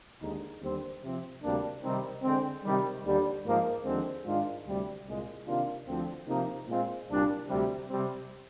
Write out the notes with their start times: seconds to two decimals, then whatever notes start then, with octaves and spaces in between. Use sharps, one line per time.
0.21 D#2 D3 G#3 D#4
0.61 D#2 D3 G3 C4
1.02 C3 F3 C4
1.42 D2 C3 G3 A#3 D4
1.83 C3 D#3 G3 C4 D#4
2.23 D3 G#3 C4
2.64 C3 D#3 G3
3.04 D#2 D3 G3
3.45 G#2 F3 A#3 D#4
3.84 D#2 D3 F3 G#3 C4
4.25 G#2 D#3 G#3 D4 F4
4.66 D2 C3 G3
5.06 C2 A#2 G#3
5.46 C3 D#3 A#3 D4 F4
5.87 D2 D3 F3 C4
6.27 C3 F3 A#3 D#4
6.67 A#2 G#3 C4 F4
7.09 C2 A#2 G3 D4
7.48 D2 C3 G3
7.89 C3 G3 C4